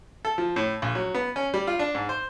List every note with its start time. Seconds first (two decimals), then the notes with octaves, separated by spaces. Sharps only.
0.25 A4
0.38 F3
0.56 A2
0.82 A#1
0.95 F#3
1.15 B3
1.36 C#4
1.54 G3
1.67 F4
1.79 D4
1.95 G#2
2.09 C5